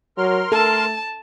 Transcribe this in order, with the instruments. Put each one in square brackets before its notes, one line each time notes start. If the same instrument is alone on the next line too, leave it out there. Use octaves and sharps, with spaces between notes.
[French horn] F#3 [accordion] A#4 C6 F6
[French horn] A3 [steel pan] A4 [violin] A5